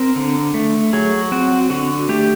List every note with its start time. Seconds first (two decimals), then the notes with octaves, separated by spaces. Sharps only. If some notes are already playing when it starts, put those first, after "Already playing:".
Already playing: C4 A#4
0.16 D3
0.54 A3
0.93 F#3 G#4
1.32 C4 F#4
1.70 D3 F#4
2.09 A3 G4